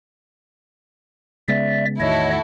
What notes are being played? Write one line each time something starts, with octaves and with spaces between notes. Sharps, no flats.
C#3 G#3 B3 D5 E5
E2 A2 D#3 E4 F#4 A4 C#5 D#5